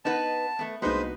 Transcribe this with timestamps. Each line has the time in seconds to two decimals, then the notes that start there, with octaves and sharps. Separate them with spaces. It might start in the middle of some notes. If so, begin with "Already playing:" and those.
0.05 B3 D#4 B4 D#5 F#5 A5
0.59 A3 B3
0.82 C2 G#3 A#3 B3 D#4 F#4 B4 C5